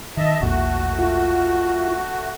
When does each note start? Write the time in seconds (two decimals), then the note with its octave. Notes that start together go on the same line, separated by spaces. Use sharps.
0.17 D#3 D#5 E5 A5
0.41 E1 A#1 A#2 A3 F#4
0.99 F4